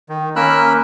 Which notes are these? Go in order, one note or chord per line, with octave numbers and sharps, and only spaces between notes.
D#3
A#3 C#4 A#4 B5 E6 F#6